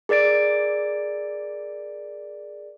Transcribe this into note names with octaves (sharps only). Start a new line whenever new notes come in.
G#4 A#4 D5 A6 D7